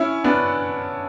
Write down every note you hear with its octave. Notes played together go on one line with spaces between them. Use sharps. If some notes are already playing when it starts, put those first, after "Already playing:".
Already playing: C#4 E4
B3 D4